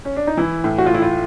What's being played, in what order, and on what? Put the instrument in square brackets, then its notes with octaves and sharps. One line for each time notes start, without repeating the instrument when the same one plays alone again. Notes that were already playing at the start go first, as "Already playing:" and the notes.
[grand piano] C#4
D4
D#4
[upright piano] E3 [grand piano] E4
[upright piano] A2
[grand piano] F#4
F4
[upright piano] A3 [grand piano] E4
[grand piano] F4